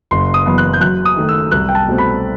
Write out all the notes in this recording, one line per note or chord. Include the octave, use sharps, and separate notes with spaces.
F#1 C6
D#6
F#2 E3 B3
F#6
G6
F#2 F#6
D#6
D#3 A3
E6
C2 F#6
G5
A5
B2 A3 C4
B5